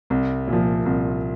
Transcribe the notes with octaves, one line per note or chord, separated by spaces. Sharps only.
C2
A#2 F3
C2